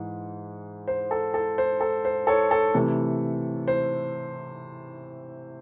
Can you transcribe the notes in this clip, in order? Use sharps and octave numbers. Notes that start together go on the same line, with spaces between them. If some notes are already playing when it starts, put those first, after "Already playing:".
Already playing: G#2 E3
C5
A4
A4
C5
A4
C5
A4 C#5
A4
C3 E3 A3
C5